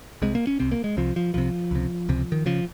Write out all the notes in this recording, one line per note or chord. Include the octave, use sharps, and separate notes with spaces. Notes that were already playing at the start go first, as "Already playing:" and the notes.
C2 C3 G#3
A#3
C#4
C2 C3 C4
A#3
G#3
C2 C3 F3
F3
C2 C3 F3
C#2 C3
C#2 C3
D#3
C#3 F3